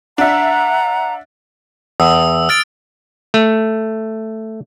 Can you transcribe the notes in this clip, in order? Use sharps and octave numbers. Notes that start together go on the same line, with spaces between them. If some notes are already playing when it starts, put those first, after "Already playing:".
D4 E5 F#5 A#5
E2 D#6 E6
F6 A6 D7
A3